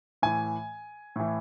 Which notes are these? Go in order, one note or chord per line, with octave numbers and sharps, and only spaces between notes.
A2 E3 G#5
A2 E3